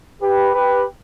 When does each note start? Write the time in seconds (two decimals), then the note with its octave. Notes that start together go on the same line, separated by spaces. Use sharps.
0.22 G4 B4
0.54 G4 B4